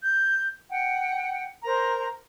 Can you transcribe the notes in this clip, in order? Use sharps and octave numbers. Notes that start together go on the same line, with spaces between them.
G6
F#5 G5
A#4 C5 A#5